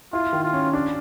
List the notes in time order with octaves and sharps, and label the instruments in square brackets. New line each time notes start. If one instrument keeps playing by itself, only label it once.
[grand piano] E4 [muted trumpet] F4
[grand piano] D#3
[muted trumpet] F4
[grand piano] C#4
D4